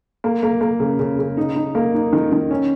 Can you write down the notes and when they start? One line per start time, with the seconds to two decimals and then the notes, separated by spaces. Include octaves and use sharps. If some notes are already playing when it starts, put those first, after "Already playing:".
0.24 A#3
0.43 A#3
0.61 A#3
0.80 C#3
0.99 C#3
1.19 C#3
1.37 D#4
1.56 D#4
1.75 A#3
1.94 D#4
2.13 D#3
2.32 D#3
2.51 C#4